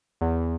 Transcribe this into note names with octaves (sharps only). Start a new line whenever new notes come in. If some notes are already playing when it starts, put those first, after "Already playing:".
E2